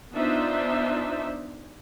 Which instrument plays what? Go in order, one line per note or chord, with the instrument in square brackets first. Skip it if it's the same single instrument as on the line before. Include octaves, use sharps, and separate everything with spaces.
[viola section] B3 D4 D#4 F4 C5 E5